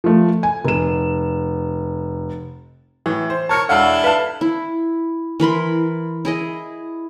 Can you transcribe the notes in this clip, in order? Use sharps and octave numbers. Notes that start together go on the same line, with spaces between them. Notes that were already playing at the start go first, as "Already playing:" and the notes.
F3 A3
G#5
F1 E7
A2 E3
C5
A#4 C#5 A5 F6 C#7
E1 D4 E4 A4 F5 F#5
B4 F5 A5
E4
E3 A#4 B5 C6
E4 G#4 D#5